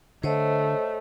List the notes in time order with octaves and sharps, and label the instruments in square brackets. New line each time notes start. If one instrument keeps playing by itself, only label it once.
[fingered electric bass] D3 [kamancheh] A3 [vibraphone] C5 C#5 D#5